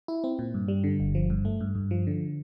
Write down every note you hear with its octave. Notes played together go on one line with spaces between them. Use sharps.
E4
C4
A#2
G2
G3
D3
G1
F3
G2
A3
G2
G2
F3
D3